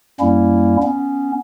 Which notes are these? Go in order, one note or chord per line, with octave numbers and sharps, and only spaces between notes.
F#2 G3 A#3 C#4 E4
B3 C#4